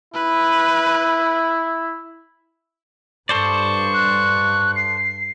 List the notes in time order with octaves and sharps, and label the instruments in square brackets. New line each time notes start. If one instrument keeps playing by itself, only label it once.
[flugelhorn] E4 [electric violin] B4
[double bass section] G2 [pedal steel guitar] A4 C5 D5 [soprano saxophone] C#6
[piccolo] F#6
C7